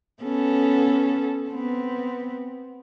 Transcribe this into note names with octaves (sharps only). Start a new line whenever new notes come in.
B3 C#4 A4
B3 C4